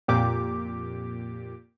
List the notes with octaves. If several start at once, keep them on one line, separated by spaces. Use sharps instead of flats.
F2 A#2 G4 D6